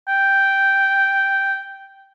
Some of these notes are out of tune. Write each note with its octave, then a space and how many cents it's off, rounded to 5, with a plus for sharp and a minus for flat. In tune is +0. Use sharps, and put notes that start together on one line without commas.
G5 -5